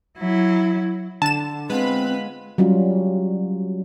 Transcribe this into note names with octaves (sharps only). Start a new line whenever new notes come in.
F#3 E4
D3 A5 E7
G#3 B3 C4 F4 B4 B5
F#3 G3 C#4 F4